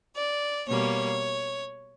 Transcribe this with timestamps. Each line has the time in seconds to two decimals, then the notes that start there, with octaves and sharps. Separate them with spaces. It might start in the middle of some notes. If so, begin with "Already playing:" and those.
0.16 D5
0.68 B2 G3 A#3 C#5